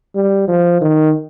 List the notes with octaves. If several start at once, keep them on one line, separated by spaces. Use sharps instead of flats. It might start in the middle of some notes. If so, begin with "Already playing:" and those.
G3
F3
D#3